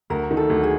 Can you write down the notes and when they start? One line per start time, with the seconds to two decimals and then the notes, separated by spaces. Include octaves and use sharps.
0.10 D2 A#4
0.31 D#3
0.37 A4
0.50 D2
0.63 G#4